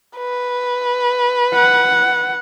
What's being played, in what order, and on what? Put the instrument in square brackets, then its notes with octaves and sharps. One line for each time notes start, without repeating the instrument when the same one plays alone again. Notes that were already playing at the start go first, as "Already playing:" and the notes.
[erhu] B4
[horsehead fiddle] F#5